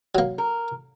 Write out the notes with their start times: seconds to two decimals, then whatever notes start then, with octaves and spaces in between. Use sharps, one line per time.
0.15 F#3 A#3
0.38 A#4